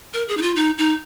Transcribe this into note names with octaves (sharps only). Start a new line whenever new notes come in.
A#4
G#4
D#4
F4
D#4
D#4